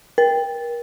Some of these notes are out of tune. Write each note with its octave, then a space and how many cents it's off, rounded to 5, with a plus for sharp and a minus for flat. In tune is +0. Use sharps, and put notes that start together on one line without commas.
A#4 +35